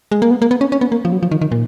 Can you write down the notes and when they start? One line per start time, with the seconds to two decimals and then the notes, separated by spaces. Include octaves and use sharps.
0.12 G#3
0.22 A#3
0.31 B3
0.42 A#3
0.51 B3
0.61 C#4
0.72 C#4
0.81 B3
0.92 A#3
1.05 F3
1.12 F#3
1.23 F3
1.31 D#3
1.41 D#3
1.52 A#2